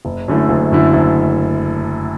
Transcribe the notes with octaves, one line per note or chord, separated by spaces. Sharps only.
F#1
F#2 D3 A3 E4
F#1
F#2 D3 A3 E4
F#1